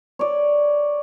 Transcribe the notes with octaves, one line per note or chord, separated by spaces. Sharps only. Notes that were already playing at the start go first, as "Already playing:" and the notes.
C#5 D5